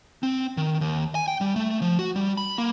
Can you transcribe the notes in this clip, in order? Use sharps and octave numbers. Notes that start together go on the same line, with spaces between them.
C4
D#3
D#2
G#5
G5
G3
A3
F3
F#4
G3
B5
A#3